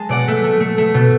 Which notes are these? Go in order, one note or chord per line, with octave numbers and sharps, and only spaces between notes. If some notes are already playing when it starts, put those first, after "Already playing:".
Already playing: G#3 A5
B2 D5 F#5
A3
A3
A3
A3
B2